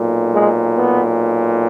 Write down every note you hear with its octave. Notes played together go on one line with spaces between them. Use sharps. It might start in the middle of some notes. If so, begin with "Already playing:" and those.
Already playing: B1 A#2
G#3
B3